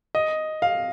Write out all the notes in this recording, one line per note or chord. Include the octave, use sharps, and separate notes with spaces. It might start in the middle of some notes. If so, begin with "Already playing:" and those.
D#5
F5